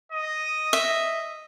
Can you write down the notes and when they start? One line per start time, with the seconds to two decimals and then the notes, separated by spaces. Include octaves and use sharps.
0.12 D#5
0.73 E5